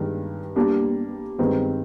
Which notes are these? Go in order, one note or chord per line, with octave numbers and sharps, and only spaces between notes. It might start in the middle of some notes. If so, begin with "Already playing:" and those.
Already playing: G2 D#3 G#3 D4
G3 A#3 D4
G2 D#3 G#3 C4